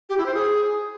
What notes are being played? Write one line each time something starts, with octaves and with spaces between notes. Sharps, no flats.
G4
E4
C5
G#4